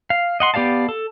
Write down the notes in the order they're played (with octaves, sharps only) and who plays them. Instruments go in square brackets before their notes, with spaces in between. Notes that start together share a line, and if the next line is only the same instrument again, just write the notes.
[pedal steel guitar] F5
D#5 F#5 C6
B3 G4 D5 F5 A5
A4